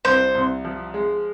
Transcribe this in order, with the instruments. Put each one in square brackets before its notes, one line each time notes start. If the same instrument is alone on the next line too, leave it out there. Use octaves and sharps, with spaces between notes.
[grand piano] C2 [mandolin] C5
[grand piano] C2
F3
G#3